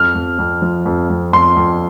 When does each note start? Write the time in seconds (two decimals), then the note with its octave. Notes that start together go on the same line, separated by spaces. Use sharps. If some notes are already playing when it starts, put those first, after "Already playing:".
Already playing: F2 F6
0.15 F2
0.38 F2
0.62 F3
0.85 F2
1.10 F2
1.33 F2 C6
1.56 F2